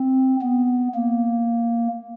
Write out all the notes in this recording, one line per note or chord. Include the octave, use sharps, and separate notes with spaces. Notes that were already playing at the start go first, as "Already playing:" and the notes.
Already playing: C4
B3
A#3